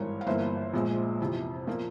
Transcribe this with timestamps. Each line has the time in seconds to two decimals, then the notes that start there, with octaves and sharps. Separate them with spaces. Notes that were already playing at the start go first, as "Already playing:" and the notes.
Already playing: G#1 G2 E3 A#4 C#5
0.21 F5
0.27 G1 G2 E3 A#3 C5 E5
0.73 A#1 A#2 G#3
1.20 F2 C3 E3
1.67 A#2 F3 A#3